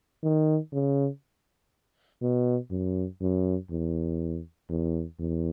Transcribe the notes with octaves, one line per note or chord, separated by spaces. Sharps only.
D#3
C#3
B2
F#2
F#2
E2
E2
E2